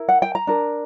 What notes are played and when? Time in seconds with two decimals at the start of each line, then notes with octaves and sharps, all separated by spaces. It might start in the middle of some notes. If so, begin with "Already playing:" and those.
Already playing: E4 A#4
0.09 F#5
0.22 G5
0.35 A#5
0.47 D4 A#4